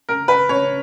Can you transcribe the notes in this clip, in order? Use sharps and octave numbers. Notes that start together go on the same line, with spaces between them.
A#4
B4
C#5